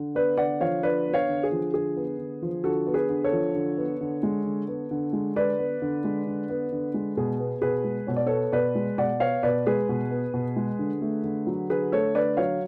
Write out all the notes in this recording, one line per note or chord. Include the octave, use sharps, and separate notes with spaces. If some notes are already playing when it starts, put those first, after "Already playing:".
Already playing: D3
B3 B4 D5
D3 D5 F#5
F3 C#5 F5
D3 B4 D5
B3
C#5 F5
D3
G#4
F3
D3 G#4
B3
D3
F3
D3 F#4 A4
B3
G#4 B4
D3
A4 C#5
F3
D3
B3
D3
G#3
D3
B3
D3
G#3
D3 B4 D5
B3
D3
G#3
D3
B3
D3
G#3
B2 G#4
B3
B2 G#4 B4
G#3
B2 C#5
D5
B3 A4 C#5
B2 B4 D5
G#3
B2 D5 F#5
B3 C#5 F5
B2 B4 D5
G#3 G#4 B4
B2
B3
B2
G#3
D3
A3
D3
F#3
D3 G#4 B4
A3 A4 C#5
D3 B4 D5
F#3 C#5 F5